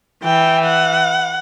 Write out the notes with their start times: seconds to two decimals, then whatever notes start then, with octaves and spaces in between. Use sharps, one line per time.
0.24 E3 G5
0.65 F#5